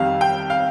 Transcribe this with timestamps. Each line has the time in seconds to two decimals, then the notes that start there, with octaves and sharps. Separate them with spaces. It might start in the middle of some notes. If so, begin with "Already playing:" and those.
Already playing: F2 D#3 G3 F5
0.21 G5
0.50 F5